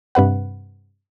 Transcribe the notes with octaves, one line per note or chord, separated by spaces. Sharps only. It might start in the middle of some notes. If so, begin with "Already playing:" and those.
G2 C3 B4 F#5